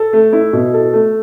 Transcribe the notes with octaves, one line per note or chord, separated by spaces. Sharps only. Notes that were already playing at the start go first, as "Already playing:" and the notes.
Already playing: A4
A3
E4
B2
A4
A3